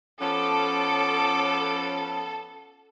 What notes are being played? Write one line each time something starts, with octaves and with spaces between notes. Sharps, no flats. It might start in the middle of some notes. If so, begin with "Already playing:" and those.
F3 B3 C#4 A4 D6